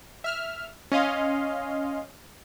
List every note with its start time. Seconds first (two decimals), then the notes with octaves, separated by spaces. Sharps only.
0.24 E5 F6
0.92 C#4 D#5 F5 C6